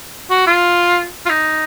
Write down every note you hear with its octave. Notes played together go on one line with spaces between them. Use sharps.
F#4
F4
F4
D#4